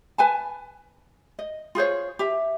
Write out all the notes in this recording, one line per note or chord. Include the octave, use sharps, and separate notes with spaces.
B4 G#5 A5
D#5
F4 G#4 C5 C#5
G4 E5